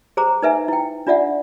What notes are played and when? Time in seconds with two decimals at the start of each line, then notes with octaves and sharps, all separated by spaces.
0.17 G#4 C5 A#5 D6
0.42 D#4 B4 E5 G#5
0.68 E4 G5
1.07 D4 F4 D5 E5 F#5